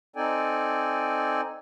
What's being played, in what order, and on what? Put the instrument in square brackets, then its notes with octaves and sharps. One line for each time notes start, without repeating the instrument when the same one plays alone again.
[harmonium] C4 D#4 A4 D5 G5 G#5